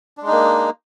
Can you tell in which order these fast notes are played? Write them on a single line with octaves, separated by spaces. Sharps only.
D4 G#3 D#4 A#3